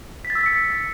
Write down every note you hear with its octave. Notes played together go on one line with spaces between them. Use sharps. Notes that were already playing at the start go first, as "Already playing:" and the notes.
B6
A6
E6
B6
C#7